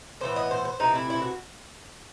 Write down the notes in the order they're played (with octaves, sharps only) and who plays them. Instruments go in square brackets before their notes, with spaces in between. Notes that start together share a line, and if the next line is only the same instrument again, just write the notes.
[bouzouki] A2 E3 B3 C5
D#5
C5
C5
C3 E3 A3 C4 D#4
E4
E4
F#4